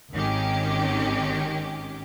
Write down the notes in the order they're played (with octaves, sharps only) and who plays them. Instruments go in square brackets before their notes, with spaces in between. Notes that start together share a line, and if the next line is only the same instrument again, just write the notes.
[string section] G#1 D#3 C#4 G4